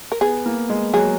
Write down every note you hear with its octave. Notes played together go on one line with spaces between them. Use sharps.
A#4
B3 G#4
A#3
G#3
F#3 G#4